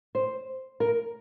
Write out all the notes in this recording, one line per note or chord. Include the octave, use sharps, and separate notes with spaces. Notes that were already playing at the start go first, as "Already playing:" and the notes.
C5
A#4